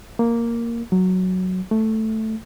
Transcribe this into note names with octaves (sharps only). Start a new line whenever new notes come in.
A#3
F#3
A3